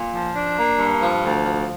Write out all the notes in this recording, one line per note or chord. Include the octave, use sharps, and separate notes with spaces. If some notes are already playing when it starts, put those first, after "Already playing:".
Already playing: A#2
F3
D4
A#3
G2
F3
D2
F3